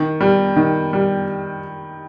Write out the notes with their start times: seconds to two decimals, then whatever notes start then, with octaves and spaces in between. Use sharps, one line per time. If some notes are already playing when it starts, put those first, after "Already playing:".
Already playing: D#3
0.21 G3
0.56 D#3
0.93 G3